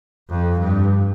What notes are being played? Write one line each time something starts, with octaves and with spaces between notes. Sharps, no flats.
F2
G2